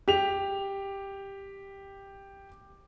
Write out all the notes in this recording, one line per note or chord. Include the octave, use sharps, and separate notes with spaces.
G4 F7